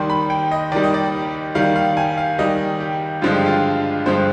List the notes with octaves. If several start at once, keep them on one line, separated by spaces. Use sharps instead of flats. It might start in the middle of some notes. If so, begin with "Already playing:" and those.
Already playing: D#2 D#3 G3 C6
B5
G5
D#5
D#2 D#3 G3 D5
D#5
D5
D#2 D#3 G3 F5
F5
G#5
F5
D#2 D#3 G3 D#5
G4
G2 D3 F3 G#3 F4
G4
F4
G2 D3 F3 G#3 C5